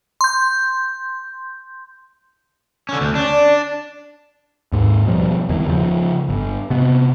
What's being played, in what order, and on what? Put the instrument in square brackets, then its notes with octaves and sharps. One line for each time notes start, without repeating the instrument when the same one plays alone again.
[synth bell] C6 G6
[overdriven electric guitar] D3 C#4
D2
[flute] C#4 [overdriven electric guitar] D4
[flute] D5
[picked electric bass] D#2 G#2
D#1 B2 F3 G3
F#1 E2 D#3 E3
C#3 F3
G1
C3 B3